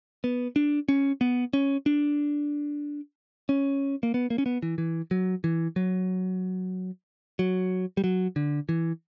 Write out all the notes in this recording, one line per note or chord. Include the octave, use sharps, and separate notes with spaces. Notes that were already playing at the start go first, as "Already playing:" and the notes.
B3
D4
C#4
B3
C#4
D4
C#4
A#3
B3
A#3
C#4
B3
E3
E3
F#3
E3
F#3
F#3
G3
F#3
D3
E3